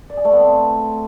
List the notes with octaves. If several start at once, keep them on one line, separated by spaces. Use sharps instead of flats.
D5
G#4
A3
B3
C4